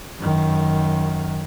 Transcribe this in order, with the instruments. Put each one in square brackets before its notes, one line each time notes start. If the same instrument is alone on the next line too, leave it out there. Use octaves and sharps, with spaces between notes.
[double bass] F#2 D#3